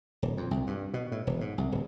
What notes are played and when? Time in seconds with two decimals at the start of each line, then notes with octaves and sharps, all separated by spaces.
0.22 D#1
0.37 F2
0.51 C2
0.67 G2
0.94 B2
1.12 A2
1.27 E1
1.41 G#2
1.58 C2
1.72 D1